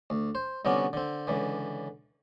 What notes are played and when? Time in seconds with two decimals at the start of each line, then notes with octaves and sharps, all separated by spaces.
0.10 D2
0.35 C5
0.65 C2 D3 B3 C#4 F#4 D6
0.93 D3 C4
1.27 C#2 D3 E3